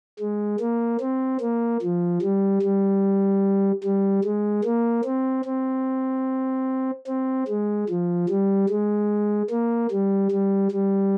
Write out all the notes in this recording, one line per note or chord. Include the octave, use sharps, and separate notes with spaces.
G#3
A#3
C4
A#3
F3
G3
G3
G3
G#3
A#3
C4
C4
C4
G#3
F3
G3
G#3
A#3
G3
G3
G3